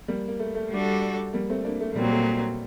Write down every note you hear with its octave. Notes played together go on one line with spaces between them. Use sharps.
G3 A#3
A#3
A3
A3
G3 D4 F#4 A4
G3 A#3
A3 C4
A#3 D4
A3
A3
A#2 F#3 G3 A#3 C4
A3